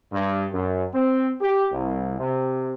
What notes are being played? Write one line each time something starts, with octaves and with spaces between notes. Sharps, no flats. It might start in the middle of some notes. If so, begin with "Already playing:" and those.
G2
F#2
C4
G4
C2
C3